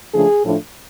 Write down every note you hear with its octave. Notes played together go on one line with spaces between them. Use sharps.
C#3 F3 A3 D4 G#4
A2 F3 A3 D4